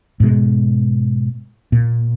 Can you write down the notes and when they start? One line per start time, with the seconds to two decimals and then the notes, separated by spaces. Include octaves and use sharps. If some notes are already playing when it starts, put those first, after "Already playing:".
0.20 G#2 B2 G#3
1.72 A#2